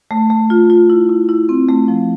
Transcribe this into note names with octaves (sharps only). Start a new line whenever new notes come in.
A3
A3
F4
F4
E4
E4
E4
C4
A3
F3